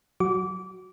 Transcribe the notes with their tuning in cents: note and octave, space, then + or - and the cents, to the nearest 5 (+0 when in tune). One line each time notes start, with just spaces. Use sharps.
F#3 +0 F#4 +0 D6 -25